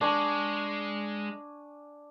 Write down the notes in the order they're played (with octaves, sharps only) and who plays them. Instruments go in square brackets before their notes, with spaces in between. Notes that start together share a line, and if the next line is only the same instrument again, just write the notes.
[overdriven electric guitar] G#3 [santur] D4 G#5 C#6